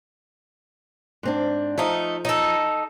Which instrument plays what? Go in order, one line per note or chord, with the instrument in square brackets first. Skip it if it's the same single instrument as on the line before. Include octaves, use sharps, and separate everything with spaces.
[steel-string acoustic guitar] G#2 C4 D4
[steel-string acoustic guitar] F3 [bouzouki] A3 D#4
[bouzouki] D#4 A4